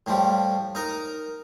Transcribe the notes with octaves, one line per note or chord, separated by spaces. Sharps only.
A2 F3 G3
D#4 A#4